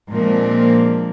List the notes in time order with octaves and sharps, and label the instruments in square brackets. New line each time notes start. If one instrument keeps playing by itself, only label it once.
[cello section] A#2 F3 G#3 A#3 C4 D4